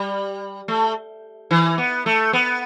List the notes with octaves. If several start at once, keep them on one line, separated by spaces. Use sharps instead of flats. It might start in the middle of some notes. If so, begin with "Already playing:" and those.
Already playing: G3
A3
E3
B3
A3
B3